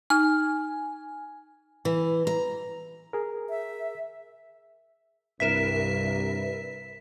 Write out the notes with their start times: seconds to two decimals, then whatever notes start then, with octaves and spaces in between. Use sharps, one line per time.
0.10 D#4 G#5 F6
1.85 E3
2.27 A#5
3.13 G#4 A#4
3.50 E5
5.40 C2 G2 A#4 B4 E5 B6 E7